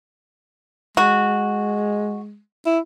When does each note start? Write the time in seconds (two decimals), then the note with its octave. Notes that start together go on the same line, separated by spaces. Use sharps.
0.97 G#3 F#4
2.66 E4